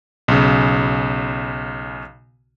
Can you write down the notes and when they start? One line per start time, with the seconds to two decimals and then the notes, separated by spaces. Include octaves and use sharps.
0.28 B1 C#3